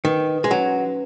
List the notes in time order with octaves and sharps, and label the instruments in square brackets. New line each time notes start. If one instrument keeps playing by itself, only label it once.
[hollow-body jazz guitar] D#3 [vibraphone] B4
[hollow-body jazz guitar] G#3
[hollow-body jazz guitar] F#3 [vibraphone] C#4